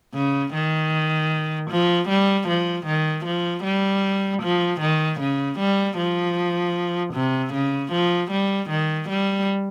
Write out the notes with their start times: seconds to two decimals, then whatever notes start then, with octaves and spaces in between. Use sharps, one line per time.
0.14 C#3
0.54 D#3
1.71 F3
2.09 G3
2.48 F3
2.86 D#3
3.25 F3
3.64 G3
4.43 F3
4.81 D#3
5.20 C#3
5.59 G3
5.98 F3
7.14 C3
7.54 C#3
7.92 F3
8.31 G3
8.70 D#3
9.09 G3